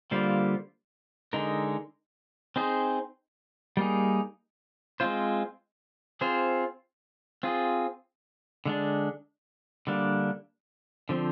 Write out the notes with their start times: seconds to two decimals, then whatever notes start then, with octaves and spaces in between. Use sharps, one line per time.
0.11 D3 G3 A#3 F4 C5
1.33 D3 G#3 D#4 A#4
2.56 C4 D#4 G#4 C5
3.77 G3 A#3 D#4 G#4
5.00 G#3 C4 F4 C5
6.21 C4 F4 G#4 C5
7.43 C4 F4 G#4
8.66 D3 G#3 D4
9.87 D3 G3 A#3 D4
11.09 D3 F3 C4